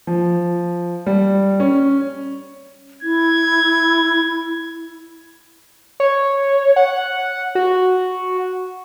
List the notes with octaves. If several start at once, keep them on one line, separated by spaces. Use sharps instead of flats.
F3
G3
C#4
E4 G#6
C#5
F#5
F#4